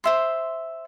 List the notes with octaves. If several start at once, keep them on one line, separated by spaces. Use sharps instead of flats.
C5 E5 C6